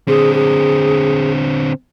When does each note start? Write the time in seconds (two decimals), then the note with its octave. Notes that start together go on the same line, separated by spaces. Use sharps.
0.08 D3 C4 G#4
0.34 G#4